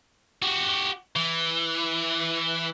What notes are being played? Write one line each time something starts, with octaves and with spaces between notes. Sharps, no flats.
F#4 G4
E3